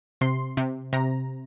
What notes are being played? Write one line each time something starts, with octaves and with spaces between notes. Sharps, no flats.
C3 C6
C3
C3 A#5